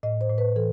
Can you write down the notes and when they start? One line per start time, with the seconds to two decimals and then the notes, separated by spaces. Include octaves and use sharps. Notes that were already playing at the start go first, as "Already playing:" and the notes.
0.03 A2 D#5
0.21 C5
0.30 A2
0.38 B4
0.56 E3 A4